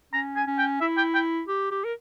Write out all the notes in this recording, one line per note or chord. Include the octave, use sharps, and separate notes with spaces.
C#4 A#5
G#5
C#4
G5
E4 E5
G5
G5
G4
G4
A#4